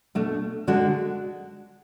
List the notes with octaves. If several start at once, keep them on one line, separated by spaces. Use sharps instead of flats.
B2 A3 D4
D3 G#3 D4 F#4